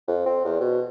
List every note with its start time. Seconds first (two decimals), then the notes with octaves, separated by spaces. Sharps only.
0.08 F2
0.26 C4
0.45 E2
0.60 B2